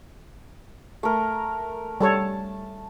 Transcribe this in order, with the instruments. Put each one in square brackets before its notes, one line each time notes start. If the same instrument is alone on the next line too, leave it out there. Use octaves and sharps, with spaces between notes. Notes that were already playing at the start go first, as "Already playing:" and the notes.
[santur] A3 A#4
[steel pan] G3 A4 C#5 [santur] A5